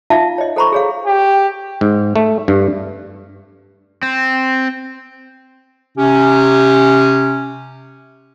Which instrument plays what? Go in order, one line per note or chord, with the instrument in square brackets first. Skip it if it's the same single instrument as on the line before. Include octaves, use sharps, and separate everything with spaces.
[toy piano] D#4 F4 E5 F5 A5
C#5 D#5
A4 C5 A#5 B5 C#6
G#4 C#5 F5
[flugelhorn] G4
[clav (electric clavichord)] G#2
A3
G2
[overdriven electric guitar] C4
[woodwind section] C3 C#4 G4